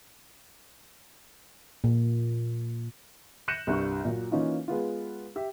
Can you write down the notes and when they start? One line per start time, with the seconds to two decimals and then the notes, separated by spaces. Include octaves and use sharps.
1.84 A#2
3.48 F#6 G6 A#6 C#7 D#7 E7
3.67 C2 G2 C#6
4.05 A#2 F#3
4.32 E3 A#3 C#4 D#4 F4
4.68 G#3 B3 F4
5.36 G4 E5